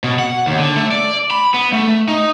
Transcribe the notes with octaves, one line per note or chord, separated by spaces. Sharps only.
B2
F#5
D#2
D3
A3
D5
B5
B3
A3
D#4